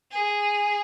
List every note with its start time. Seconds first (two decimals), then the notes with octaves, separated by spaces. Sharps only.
0.11 G#4